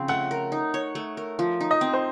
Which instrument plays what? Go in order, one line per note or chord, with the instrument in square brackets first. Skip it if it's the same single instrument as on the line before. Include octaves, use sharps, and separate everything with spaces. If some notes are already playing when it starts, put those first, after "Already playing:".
Already playing: [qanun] C#3 F3 C4
[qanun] A3 [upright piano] F#5
[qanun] A#4
D#4
C#5
A3
A#4
F3
D#4
[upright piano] D#5
[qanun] C4
[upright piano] C5